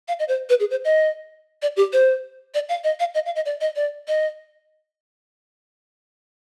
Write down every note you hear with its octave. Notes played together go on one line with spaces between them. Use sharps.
F5
D#5
C5
B4
G#4
C5
D#5
D5
G4
C5
D5
F5
D#5
F5
D#5
F5
D#5
D5
D#5
D5
D#5